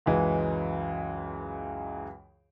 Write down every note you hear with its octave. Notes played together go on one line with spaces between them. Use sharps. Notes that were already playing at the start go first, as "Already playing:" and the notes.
C#2 F#2 E3 G#3